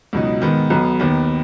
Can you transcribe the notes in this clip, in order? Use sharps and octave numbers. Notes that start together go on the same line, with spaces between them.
C#2 B2 F#3 D#4
G#2 D#3 B3
B1 B2 B3
D#2 D#3 B3